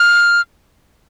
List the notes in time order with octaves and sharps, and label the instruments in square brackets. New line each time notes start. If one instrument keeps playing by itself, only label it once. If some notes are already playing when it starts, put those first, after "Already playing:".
Already playing: [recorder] F6